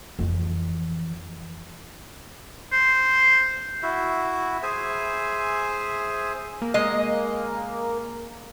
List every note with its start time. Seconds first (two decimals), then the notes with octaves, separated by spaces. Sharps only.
0.19 F2 E3
2.72 C5
3.83 E4 F#4 E5
4.63 G#4 C5 E5 G#5
6.62 A#3
6.74 G#3 D#5